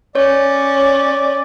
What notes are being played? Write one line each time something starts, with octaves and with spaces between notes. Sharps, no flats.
C#4 C#5 D5